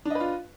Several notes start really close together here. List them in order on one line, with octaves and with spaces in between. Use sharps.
D4 D#5 B4 F4